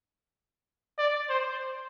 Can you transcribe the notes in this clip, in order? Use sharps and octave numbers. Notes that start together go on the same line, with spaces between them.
D5
C5